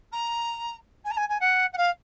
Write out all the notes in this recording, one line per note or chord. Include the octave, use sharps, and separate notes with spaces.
A#5
G#5
A#5
G#5
G#5
F#5
F#5
F5